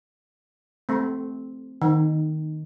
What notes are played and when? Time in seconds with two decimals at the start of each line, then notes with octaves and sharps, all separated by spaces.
0.89 A3 C4
1.82 D#3